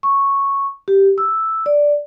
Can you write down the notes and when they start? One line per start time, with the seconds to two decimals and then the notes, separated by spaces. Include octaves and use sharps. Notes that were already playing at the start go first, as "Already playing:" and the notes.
0.03 C#6
0.88 G4
1.18 E6
1.66 D5